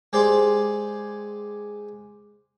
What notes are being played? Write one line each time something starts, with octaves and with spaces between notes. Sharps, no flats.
G#3 G4 G#4 C5 D5 C6